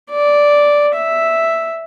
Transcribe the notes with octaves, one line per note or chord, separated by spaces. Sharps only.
D5
E5